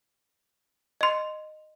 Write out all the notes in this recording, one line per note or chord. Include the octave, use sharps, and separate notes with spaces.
D#5 C6